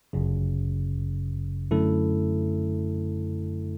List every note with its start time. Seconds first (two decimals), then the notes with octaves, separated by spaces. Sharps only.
0.13 G1 F#2 C#3
1.71 F#2 D3 A3 E4 A4